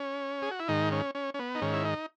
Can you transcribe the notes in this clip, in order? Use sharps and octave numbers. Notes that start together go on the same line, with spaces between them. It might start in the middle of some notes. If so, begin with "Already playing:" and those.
Already playing: C#4
G#4
F#4
E4
G#2 D#3 D#4
C#4
C#4
C#4
B3
D#4
G#2 D#3 C#4
E4
D#4